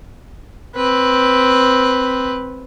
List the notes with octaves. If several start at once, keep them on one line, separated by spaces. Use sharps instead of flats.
C4 B4